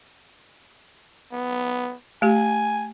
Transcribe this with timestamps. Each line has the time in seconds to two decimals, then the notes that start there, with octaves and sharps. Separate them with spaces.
1.33 B3
2.22 A3 G4 G#5